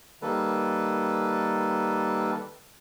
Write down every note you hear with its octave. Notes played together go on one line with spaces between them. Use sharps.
D#3 G3 A#3 A4 B4